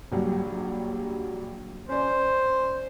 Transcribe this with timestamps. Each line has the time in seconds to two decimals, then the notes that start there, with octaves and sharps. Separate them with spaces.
0.12 A#1 F#3 G3
1.89 C#4 C5 D5